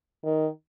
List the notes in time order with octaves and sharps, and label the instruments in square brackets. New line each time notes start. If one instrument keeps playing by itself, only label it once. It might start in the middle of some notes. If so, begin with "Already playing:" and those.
[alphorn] D#3